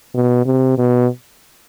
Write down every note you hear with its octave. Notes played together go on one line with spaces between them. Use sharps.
B2
C3
B2